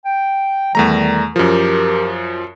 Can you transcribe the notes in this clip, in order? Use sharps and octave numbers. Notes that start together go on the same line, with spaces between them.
G5
E2 D#3 G3 A3 A#5
F#2 F3 G4 A#4